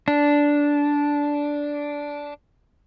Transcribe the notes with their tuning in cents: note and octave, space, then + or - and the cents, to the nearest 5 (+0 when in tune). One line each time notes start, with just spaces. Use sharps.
D4 -10